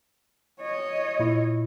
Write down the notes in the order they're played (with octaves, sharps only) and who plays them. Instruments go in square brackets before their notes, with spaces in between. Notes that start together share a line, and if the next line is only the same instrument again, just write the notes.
[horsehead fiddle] C#5 D#5
[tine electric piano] A#2 E4